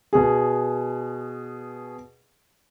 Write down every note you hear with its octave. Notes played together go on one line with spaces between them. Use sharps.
B2 G#4